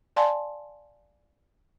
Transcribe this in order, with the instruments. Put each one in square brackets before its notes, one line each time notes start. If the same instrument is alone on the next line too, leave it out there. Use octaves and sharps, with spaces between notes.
[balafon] D5 F5 G#5 A5 C6